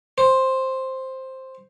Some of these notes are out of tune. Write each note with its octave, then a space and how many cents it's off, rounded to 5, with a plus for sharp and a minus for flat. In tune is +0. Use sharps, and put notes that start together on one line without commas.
C5 +5